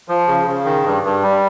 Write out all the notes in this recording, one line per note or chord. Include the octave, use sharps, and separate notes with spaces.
F3
C#3
C#3
D#3
G2
G2
G3